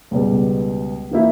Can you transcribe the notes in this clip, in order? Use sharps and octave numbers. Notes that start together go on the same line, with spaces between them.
C#2 B2 G3 B3
E3 A#3 E4